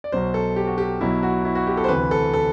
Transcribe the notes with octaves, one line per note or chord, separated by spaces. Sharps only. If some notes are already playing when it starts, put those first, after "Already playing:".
D5
B1 B2 F#3 C5
A4
G4
F#4
G4
B1 B2 F#3 E4
F#4
E4
F#4
G4
A4
C5
D2 C3 E3 B4
A4
A4